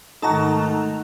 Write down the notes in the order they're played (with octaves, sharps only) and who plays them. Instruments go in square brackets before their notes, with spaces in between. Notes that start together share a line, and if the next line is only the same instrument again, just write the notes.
[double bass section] G#2 D#3 A3 [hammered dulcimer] D#4 F#4 [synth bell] A4 A5 A#5